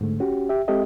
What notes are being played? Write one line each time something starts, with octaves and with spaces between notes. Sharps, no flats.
G#2 D3 A3
C#4 F#4 G4
G4 E5
G#3 C4 G4 A4 D#5 E5